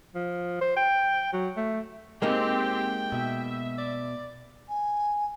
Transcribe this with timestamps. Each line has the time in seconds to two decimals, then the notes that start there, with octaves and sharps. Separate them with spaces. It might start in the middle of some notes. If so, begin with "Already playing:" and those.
0.15 F3
0.61 C5
0.76 G5
1.33 F#3
1.57 A3
2.22 G#3 A#3 C4 D#4 G4 G5
3.12 B2 E5
3.78 D5
4.68 G#5